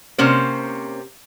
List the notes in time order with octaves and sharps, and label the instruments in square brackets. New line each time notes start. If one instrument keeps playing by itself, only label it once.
[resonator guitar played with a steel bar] C3 A#3 C#4 C5